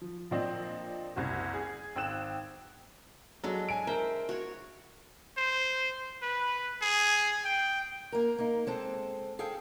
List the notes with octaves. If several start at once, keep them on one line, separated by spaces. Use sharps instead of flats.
F3
A#2 F3 C4 D4 D#5
F#1 C2 G#6
G#4
G#1 G5 E6 F#6 E7
F#3 G#3 D4 A4
G#5 D7
A#4 C5 E5
F#4 C#5
C5
B4
G#4
G5
A#3 A#4
A#3 D#4
G#3 C4 A4
G#4 A4 F5 G5